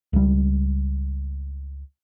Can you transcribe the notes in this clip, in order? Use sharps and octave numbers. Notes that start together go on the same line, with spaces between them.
C#2 G3